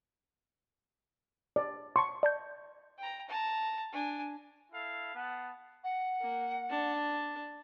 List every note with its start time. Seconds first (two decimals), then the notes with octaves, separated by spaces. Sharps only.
1.56 D5
1.96 A5 C6 C#6
2.23 D5 A5 G6
2.98 G5 A#5
3.28 A5 A#5
3.92 D4 G#5
4.72 E4 A4 F5
5.15 B3 F#5 A5
5.83 F#5
6.21 A#3
6.70 D4 A5